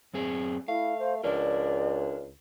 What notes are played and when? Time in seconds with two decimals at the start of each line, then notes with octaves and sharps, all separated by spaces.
0.14 F#2 C4 G#4
0.68 A3 E4 F5
0.99 C5
1.24 C#2 D4 A#4 D5